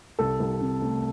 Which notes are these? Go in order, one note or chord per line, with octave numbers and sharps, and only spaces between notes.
C2 A4
C2
C3
A3